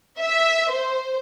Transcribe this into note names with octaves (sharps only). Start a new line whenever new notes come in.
E5
C5